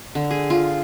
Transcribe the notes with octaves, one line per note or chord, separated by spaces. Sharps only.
D3
G#4
F4